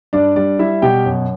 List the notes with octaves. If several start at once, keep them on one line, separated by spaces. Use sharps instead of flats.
G2 D4 D5
G3 D4 D5
G3 E4 E5
B2 G4 G5
F#2